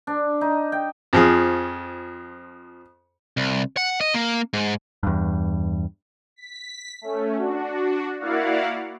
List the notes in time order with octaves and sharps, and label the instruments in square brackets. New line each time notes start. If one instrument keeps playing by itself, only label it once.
[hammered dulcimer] D4
D#4
G5
[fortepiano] F2 F3 G#4
[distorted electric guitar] C2
F#5
D#5
A#3
G#2
[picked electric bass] E2 G2
[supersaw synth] B6
A3 C#4
D4 F#4
A#3 E4 F#4 D5 F5 F#5